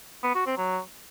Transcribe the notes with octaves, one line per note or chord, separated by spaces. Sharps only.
B3
F#4
C4
F#3